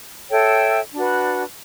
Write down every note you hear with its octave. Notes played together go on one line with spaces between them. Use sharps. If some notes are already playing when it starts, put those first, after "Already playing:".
A4 C#5 E5 G5
D4 F#4 B4